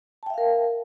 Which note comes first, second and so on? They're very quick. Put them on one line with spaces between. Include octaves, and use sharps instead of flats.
A5 G5 E5 F5 A#4